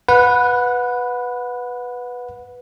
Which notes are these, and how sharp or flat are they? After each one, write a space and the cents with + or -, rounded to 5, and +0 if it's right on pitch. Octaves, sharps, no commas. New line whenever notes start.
B4 +0 F#5 -25